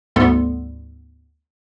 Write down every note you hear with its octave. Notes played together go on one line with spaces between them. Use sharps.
D2 G#2 G3 B3 A4 C6